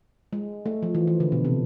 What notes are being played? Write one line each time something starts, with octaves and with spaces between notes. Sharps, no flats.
G#3
A3
F3
E3
E3
D3
B2
C3